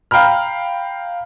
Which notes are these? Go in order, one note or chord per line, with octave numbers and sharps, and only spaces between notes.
F5 G5 A#5 B5 F6